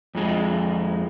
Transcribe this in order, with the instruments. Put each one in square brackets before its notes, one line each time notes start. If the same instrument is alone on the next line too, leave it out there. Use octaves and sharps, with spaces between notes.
[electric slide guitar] F2 G#3